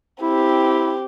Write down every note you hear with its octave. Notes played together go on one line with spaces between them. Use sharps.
C4 E4 G4